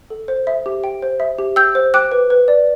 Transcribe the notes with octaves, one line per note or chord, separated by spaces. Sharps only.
A4
C5
E5
G4
G5
C5
E5
G4
G5 E6 G6
C5
G5 D6 F#6
B4
B4
D5